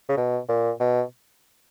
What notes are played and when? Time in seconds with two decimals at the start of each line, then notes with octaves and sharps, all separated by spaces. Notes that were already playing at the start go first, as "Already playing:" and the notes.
0.09 C#3
0.17 B2
0.49 A#2
0.80 B2